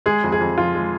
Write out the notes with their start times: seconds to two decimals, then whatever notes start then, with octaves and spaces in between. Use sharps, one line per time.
0.06 G#3 G#4
0.24 F2
0.32 G#4
0.41 F2
0.58 F3 F4
0.75 G#3